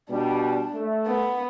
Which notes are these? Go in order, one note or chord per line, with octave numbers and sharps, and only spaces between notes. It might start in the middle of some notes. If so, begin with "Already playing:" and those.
B2 G3 D4
A3
B3